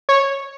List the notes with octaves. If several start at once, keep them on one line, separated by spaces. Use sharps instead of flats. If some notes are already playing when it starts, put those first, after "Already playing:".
C#5